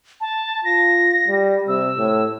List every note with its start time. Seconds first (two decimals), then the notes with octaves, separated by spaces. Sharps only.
0.21 A5
0.65 F4 A#6
1.28 G3
1.68 C3 E6
1.98 A2